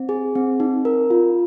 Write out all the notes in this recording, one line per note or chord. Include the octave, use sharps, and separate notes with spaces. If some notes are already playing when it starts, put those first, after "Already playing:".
Already playing: C4
G#4
C4
D#4
A#4
F4